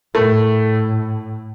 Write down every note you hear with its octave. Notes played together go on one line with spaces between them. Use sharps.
A2 A3